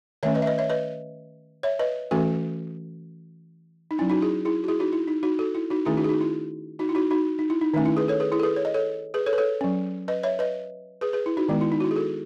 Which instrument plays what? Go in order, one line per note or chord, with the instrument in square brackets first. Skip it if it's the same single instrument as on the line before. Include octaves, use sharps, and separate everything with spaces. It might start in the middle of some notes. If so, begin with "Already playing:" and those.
[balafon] D#3 A3 C#4 C#5 E5
B4 D#5
E5
B4 D#5
C#5 E5
B4 D#5
C#5 E5
B4 D#5
E3 A3 C#4 F#4 A4
D#4
F#3 C#4 E4
D#4 F#4
E4 G#4
E4 G#4
F#4
E4 G#4
D#4 F#4
E4
D#4
D#4 F#4
F#4 A4
E4
D#4 F#4
D#3 A3 C#4 E4 G#4
D#4 F#4
G#4
D#4 F#4
E4
D#4 F#4
E4
D#4 F#4
D#4 F#4
D#4
E4
D#4
D#3 A3 C#4 D#4
E4
G#4 B4
A4 C#5
G#4 B4
E4 G#4
A4
G#4 B4
C#5
D#5
A4 C#5
G#4 B4
A4 C#5
B4
A4 C#5
F#3 C#4
B4 D#5
C#5 E5
B4 D#5
G#4 B4
G#4 B4
E4
D#4 F#4
D#3 G#3 B3
E4
D#4
F#4
E4
G#4
F#4 A4